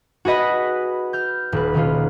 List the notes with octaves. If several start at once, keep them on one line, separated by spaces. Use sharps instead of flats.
F#4 G#4 B4 D#5 B5
F6 G6
D#1 B4
B2 D#3 C#4 F4